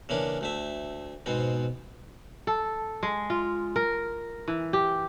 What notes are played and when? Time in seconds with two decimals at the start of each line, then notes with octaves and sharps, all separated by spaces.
0.09 C#3 E3 A#3 C#4 D4
0.41 D2 A3 E5
1.26 G#2 B2 B3 C4
2.47 A4
3.03 G#3
3.30 F4
3.76 A#4
4.48 E3
4.73 G4